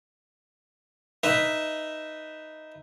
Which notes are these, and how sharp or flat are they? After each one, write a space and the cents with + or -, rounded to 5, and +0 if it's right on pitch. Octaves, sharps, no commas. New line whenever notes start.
D#4 +0 B4 +0 E5 +0